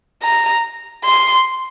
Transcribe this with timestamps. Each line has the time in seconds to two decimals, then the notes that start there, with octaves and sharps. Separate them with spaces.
0.23 A#5
1.04 C6